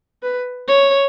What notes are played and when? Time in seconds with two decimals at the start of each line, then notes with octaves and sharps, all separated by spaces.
0.23 B4
0.68 C#5